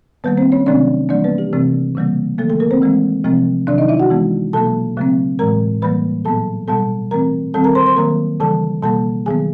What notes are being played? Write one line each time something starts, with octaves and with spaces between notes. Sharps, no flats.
D#3 G3 A#3 B3 B4
C4 C5
C#4 C#5
C3 D#3 F#3 A3 C4 D4 D5
E3 G3 A#3 D4 D5
B3 B4
G4
C3 E3 A3 C4
C#3 E3 G3 A#3
D#3 F#3 A3 A#3 A4
A3 A4
A#3 A#4
C4 C5
E3 G#3 C4
C3 F3 A3 C4
C3 D#3 F#3 D4 D5
D#4 D#5
E4 E5
F#4 F#5
E3 G#3 B3
B2 F#3 A#3 A4 A5
C#3 F#3 A3 C4
A2 E3 G#3 A#4 A#5
E3 G3 A#3 B4 B5
A#2 F#3 B3 A4 A5
B2 G3 B3 A4 A5
E3 A3 C4 A#4 A#5
D#3 G3 C4 A4 A5
A#4 A#5
C5 C6
C5 C6
D#3 F#3 A#3 A#4 A#5
C#3 E3 G3 A4 A5
B2 G3 A#3 A4 A5
D#3 F#3 B3 G#4 G#5